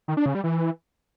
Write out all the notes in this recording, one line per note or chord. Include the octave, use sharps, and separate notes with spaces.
D#3
D4
C#3
G3
E3